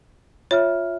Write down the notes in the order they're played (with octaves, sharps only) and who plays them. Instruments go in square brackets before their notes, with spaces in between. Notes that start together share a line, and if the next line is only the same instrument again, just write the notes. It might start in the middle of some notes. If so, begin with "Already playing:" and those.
[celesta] F4 E5 F6 [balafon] C#5